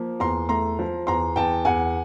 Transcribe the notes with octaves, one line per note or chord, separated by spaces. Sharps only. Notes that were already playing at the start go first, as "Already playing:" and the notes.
Already playing: F3 A#3
E2 A#5 C6
A3 A#5 C6
F3
E2 A#5 C6
E2 G5 A5
E2 F#5 G#5